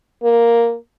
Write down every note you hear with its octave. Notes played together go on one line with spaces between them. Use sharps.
A#3